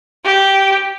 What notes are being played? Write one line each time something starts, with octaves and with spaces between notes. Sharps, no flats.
G4